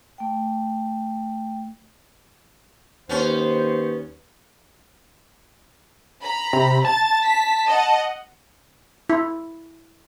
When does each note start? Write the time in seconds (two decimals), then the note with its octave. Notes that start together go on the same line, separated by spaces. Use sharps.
0.18 A3 G5
3.09 D#2 B3 C#4 C5
6.22 A#5 B5
6.53 C3
6.85 A5 A6
7.26 B6
7.67 D#5 F#5
9.10 E4